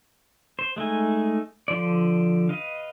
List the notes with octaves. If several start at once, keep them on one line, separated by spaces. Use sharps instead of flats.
C5
G#3 A3 D#4 G#5
D3 F3 C5 D5
B4 D#5 F5